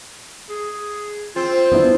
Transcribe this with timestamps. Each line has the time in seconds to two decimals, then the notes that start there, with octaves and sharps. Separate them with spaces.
0.49 G#4
1.36 C4 F4
1.72 B3 D4 E4